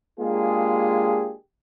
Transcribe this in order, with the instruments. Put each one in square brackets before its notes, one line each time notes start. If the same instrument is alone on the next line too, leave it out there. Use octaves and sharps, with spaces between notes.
[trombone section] G#3 A#3 D4 F4 G4 G#4